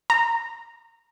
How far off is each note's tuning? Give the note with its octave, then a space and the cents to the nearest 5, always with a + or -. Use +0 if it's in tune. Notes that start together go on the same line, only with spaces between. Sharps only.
A#5 -20